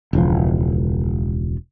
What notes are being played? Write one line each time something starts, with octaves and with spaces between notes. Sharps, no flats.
E1 C#2 F3